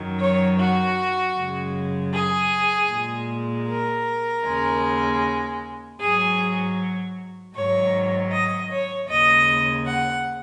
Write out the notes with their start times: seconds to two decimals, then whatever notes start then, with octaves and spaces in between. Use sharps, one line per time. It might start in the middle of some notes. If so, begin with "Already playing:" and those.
Already playing: F#2 D#3 F#3
0.20 C#5
0.58 F#4
1.36 F#2 C#3 G#3
2.13 G#4
2.90 A#2 G#3
3.68 A#4
4.45 D#2 C#3 G#3
5.99 G#2 F#3 G#4
7.54 G#2 D#3 F#3 C#5
8.31 D#5
8.70 C#5
9.08 D#2 C#3 G#3 D#5
9.86 F#5